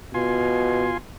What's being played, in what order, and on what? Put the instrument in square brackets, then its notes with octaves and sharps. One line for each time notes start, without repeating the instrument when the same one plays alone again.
[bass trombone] B2 [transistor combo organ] F4 G#5 C6